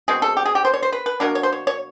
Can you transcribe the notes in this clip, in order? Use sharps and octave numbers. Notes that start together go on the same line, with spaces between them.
B2 G#3 C4 G#4
A4
G4
G#4
G4
C5
C#5
C5
B4
B4
B2 F#3 A#3 D4 A#4
C#5
C5
C#5
C#5